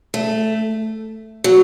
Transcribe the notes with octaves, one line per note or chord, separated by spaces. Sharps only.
A3
F#3